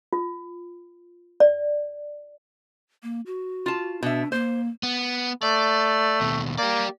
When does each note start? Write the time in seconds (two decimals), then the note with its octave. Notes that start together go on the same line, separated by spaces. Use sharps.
0.13 F4
1.40 D5
3.03 A#3
3.26 F#4
3.66 F4 A5
4.03 B2 D4 E5
4.32 A#3 C5
4.83 B3
5.43 A3 D5
6.21 D#2 B2
6.58 A#3 G4 D5